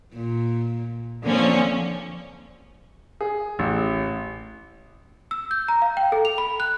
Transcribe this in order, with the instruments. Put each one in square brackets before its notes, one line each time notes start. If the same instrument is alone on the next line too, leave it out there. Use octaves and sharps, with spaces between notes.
[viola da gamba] A#2
[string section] D3 F3 C#4 [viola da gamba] A#3 C4
[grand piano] G#4
A1
[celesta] E6
G6
A#5
F5
G5
A4
F7
B5
F#6